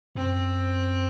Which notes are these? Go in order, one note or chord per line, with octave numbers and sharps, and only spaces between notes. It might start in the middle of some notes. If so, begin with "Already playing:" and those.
F#2 C4